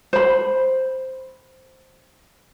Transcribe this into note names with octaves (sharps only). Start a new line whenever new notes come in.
C5 B5